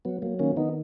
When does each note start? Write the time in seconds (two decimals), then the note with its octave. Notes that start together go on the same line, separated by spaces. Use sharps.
0.05 F#3 B3
0.22 F#3 A#3
0.39 D#3 A#3 C#4
0.57 D#3 B3 D#4